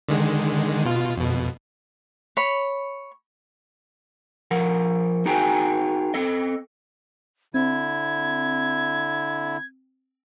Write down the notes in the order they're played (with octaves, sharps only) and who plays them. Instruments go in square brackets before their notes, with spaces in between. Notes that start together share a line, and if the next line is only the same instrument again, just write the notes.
[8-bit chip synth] D3 D#3 G#3
B2 F4
F2 B2
[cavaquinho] C#5 B5
[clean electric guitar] F3 A#4 F#5
D#4 F#4 G#4 A#4 G5 G#5
C4 A4 D#5
[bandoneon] D3 E4 [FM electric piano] C4 [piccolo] G#6